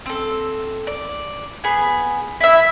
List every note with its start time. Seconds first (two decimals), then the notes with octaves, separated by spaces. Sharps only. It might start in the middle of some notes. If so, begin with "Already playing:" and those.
0.06 C4 A4
0.87 D5
1.64 B3 G#4 G#5
2.40 E4 E5